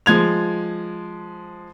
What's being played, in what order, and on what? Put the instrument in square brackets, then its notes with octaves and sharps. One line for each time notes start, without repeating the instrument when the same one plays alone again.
[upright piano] F3 G#3 G#6 F7